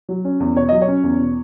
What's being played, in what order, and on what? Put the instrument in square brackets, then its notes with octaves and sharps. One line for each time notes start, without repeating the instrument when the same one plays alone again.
[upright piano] F#3
C#4
E2
B2 C#5
F#3 D#5
C#5
C#4
E2
B2